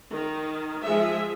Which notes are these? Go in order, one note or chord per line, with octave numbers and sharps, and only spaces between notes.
D#3
F3 G#3 G#4 E5